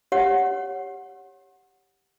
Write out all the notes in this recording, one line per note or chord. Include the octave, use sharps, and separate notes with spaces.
G4 C#5 F#5